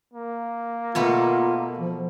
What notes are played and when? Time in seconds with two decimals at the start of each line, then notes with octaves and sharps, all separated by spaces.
0.13 A#3
0.95 B2 A3 B3 F4
1.79 F3